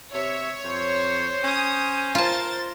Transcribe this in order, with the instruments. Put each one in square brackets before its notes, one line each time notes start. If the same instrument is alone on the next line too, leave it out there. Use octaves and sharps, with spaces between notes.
[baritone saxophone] C3 [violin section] C#5 [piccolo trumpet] E5
[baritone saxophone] F2 [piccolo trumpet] C5
[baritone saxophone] C#4 [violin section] D#6
[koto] F4 A5 [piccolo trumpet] A#4 [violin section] C5 A6